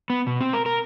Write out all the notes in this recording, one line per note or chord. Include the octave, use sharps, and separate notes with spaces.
B3
B2
C4
A#4
A#4